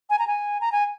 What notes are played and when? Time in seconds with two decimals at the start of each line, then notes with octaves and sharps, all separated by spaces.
0.10 G#5
0.19 A#5
0.27 G#5
0.61 A#5
0.72 G#5